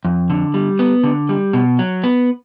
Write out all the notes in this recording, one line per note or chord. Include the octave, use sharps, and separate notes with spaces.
F2
D3
G3
B3
D3
G3
B2
F#3
B3